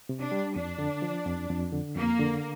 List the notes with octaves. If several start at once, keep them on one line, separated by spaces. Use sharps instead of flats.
C3
D4
G3
F2 D4
D3
F3
F2
F2
D3
F2 A#3
D3